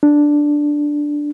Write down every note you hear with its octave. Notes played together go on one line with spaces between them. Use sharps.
D4